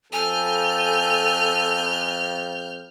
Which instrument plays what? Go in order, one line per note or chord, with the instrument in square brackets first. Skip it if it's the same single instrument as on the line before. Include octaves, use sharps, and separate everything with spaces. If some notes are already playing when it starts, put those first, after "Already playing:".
[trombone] F2 [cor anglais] A4 [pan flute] G#5 [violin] F6 G6